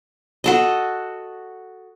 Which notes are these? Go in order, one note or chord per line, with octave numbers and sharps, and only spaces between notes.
F#4 A4 D#5